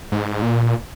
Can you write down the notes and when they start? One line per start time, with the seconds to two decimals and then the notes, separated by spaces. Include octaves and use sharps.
0.12 G#2
0.42 A#2